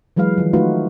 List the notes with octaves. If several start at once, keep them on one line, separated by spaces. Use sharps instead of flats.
E3 F#3 G#3 B4 F5
D#3 F3
A3 D#4 F4 F#4 B4